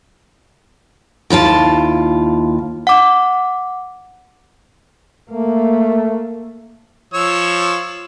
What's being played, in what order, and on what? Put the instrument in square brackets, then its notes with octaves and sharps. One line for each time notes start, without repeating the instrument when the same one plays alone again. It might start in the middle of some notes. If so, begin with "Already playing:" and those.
[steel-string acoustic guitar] D#2 E4 F4 A5
[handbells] F#5 D6
[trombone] A3 [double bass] A#3
[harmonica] F3 C#5 E6